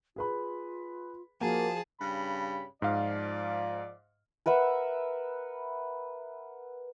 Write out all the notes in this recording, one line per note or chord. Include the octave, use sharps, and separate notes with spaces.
F4 G#4 B4 B5
F3 A#3 F#4 G#4 A5
G2 C#3 B5
G#2 F3 D5 F5
A#4 B4 E5 F#5